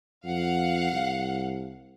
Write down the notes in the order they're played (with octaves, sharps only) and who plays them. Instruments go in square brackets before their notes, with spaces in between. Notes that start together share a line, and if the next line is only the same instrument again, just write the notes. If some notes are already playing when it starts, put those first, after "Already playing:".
[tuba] F2 [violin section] F5 F#5
[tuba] C2